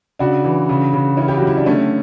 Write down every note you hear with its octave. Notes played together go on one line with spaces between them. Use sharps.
C#3 D4 F#4
E3
C#3
C#3
E3 C#4 E4
G4
F#4
F#2
E4
D4
D3 A3 C#4